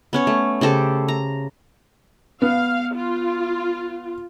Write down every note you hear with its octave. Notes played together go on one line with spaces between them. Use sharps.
B3 C#4 C#5
A3
C#3 G4 A4 C5
A#5
B3 F5
F4